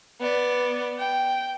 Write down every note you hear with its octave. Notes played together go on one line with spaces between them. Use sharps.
B3 D5
G5